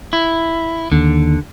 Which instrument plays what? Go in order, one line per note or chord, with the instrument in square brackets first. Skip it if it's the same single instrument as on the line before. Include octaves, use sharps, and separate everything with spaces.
[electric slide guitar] E4
[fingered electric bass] D#2 [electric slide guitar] D3